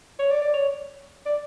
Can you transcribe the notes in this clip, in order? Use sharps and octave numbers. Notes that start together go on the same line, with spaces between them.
C#5
D5
D5
C#5
D5